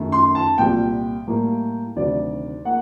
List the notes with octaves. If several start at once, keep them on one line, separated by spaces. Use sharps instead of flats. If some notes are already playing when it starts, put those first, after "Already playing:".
Already playing: F#2 D#3 A3
C6
A5
C2 A#2 G3 G5
A2 G3 A#3
D2 C3 D#3 F#3 D5
A#3 F#5